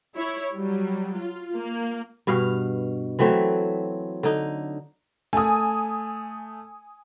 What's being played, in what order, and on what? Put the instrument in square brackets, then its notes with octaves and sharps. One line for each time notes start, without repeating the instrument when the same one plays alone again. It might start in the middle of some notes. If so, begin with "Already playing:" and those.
[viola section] E4 C#5
F#3 G3
F4
A#3
[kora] G2 B2 F5
E3 F#3 A3 C4
D3 D#4
[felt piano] A3 [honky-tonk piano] G#5 D#6